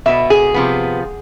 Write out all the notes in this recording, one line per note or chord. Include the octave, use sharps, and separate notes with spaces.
B2 B3 E5
G#4
C3 F3 B3